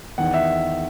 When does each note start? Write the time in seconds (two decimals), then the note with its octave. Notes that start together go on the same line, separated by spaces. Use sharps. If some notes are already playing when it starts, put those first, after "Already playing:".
0.18 E2 D#3 F#5
0.34 E5